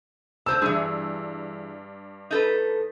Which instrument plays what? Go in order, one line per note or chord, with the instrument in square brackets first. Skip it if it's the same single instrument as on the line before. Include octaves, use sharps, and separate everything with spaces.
[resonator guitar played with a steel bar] D3 C5 A5 [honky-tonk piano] E6
[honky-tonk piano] G2 [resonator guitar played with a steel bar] E3 G#4
[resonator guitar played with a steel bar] D#4 A4 B4